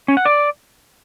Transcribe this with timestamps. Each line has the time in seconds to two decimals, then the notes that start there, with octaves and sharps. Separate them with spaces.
0.08 C#4
0.17 F#5
0.25 D5